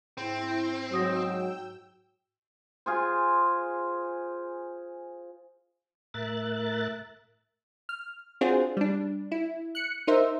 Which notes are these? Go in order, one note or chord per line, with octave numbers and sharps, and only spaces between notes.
G#2 C4 E4
G#2 F#3 F#4 G5 D#6 E6 A#6
F4 G#4 C5
A2 A#4 E5 F#6 A6
F6
C4 D4 F4 F#4 G#4 C5
G3 D4
E4
F#6 C#7
D#4 A#4 C5 E5